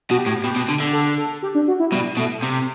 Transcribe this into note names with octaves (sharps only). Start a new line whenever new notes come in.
B2 F#4
G4
A2
B2 G4
B2
D3
D3
A4
A4
G4
D4
F#4
E4
B2 G3
B2 A3
C3